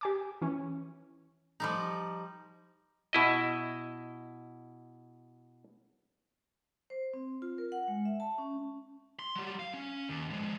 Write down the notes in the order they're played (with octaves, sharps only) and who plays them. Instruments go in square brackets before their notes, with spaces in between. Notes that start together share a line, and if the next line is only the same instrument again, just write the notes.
[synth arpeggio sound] G4 G#5 D6
E3 C#4
[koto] F3 G3 D#4
[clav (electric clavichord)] B2 E4 D#5
[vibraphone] C5
C4
F4
A#4
F#5
G#3
E5
A5
C#4
[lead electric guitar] C6
F#3 G3
F5
C#4
D#2
F3 G#3